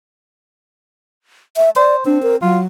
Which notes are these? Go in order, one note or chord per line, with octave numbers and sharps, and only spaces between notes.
E5
C5 D5
C4 D4
A#4
F#3 F4